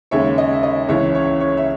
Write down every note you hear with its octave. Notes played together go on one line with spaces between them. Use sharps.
D#2 C#3 G#3 C#5 E5
D#5
E5
D#5
C#2 C#3 E3 C#5 E5
C#5
C#5
E5